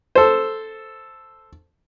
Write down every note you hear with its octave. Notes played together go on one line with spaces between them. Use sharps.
A4 C5